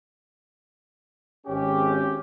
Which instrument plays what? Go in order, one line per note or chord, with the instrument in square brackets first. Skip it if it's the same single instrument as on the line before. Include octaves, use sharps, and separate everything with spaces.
[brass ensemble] G#1 C#4 G4